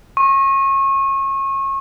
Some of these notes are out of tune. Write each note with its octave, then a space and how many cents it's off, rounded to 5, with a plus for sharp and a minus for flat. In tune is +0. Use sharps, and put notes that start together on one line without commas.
C#6 -30